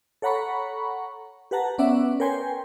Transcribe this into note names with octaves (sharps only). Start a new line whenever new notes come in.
A4 C#5 F#5 A#5 B5 C#6
G4 B4 F#5 A5 A#5
B3 C#4 B4 D5 E5 F#5
A#4 B4 C#5 G5 G#5 C6